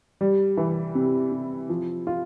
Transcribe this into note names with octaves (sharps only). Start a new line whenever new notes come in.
G3
E3
C3
C3
F3
F4